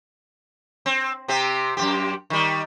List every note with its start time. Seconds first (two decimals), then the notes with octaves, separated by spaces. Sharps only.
0.86 C4
1.28 C3 C4 G4
1.77 F#2 A#2 G4
2.30 D#3 G3